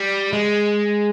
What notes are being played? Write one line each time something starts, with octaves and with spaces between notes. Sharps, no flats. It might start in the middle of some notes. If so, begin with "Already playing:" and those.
Already playing: G3
G#3